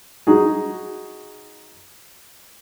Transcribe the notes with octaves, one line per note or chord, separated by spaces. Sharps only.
D#4 F#4 G#4